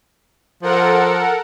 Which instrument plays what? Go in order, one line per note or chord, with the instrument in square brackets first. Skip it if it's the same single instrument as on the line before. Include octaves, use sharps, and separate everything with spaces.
[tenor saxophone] F3 [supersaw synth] A4 A#4 F#5